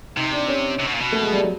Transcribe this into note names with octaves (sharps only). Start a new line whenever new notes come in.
C3 D#4
D4
C#4
C3
B2
A#2
B2
A3
G#3
G3
F#3